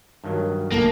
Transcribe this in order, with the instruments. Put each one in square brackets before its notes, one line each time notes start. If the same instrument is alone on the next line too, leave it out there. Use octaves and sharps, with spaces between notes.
[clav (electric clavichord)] G2 D#3 F#3
[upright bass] D2 [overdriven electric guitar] A#3 [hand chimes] E4 A4 A5